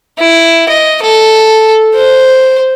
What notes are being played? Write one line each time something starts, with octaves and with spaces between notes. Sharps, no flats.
E4
D#5
A4
C5